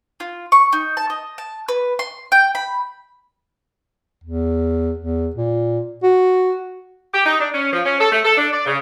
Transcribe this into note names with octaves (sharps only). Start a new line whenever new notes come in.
F4
C#6
D#4
A5
D#5
A5
B4
C6
G5
B5
E2
E2
A#2
F#4
G4
D#4
D4
C#4
F3
C#4
A4
A3
A4
D4
D5
C#3